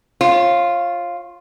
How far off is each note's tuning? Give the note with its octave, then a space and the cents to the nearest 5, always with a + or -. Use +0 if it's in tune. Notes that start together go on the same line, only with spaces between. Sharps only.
F4 +0 C#5 -35